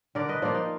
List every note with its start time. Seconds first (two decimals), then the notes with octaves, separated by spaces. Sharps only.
0.15 D3 A#4 D5
0.29 B4 D#5
0.42 F3 A#3 D4 F4
0.55 D#4